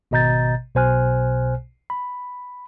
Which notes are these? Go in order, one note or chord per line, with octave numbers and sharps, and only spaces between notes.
G#1 B2 D#5 A#5 G6 A6
B1 B2 C5 G#5 F6 F#6
B5